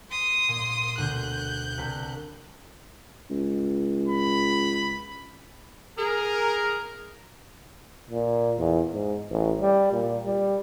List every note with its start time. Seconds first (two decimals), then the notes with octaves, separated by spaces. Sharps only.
0.11 C6 D#6
0.49 A#2
0.98 D2 B2 F#6 G6
1.78 C2 B4 A5
3.30 C#2
4.08 B5
5.98 G#4 A#4
8.10 A#2
8.59 E2
8.93 G#2
9.31 A1
9.61 G3
9.92 A#2
10.26 G3